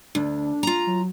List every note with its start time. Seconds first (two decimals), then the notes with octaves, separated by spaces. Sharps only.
0.15 D2 D4
0.63 F4 A#5
0.87 F#3